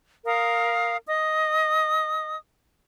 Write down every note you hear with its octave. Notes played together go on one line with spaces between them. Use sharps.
A#4 F5 D#6
D#5 D#6